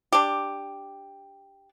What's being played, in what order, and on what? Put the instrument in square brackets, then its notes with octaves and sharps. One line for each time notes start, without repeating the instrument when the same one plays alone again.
[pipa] D4 G4